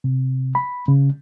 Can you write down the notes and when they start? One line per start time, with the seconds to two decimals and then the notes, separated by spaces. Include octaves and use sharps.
0.04 C3
0.55 B5
0.88 C#3